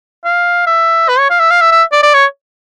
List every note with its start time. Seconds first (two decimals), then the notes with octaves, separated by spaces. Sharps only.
0.25 F5
0.67 E5
1.08 B4
1.19 C#5
1.30 F5
1.40 E5
1.50 F5
1.61 E5
1.72 E5
1.92 D5
2.03 D5
2.14 C#5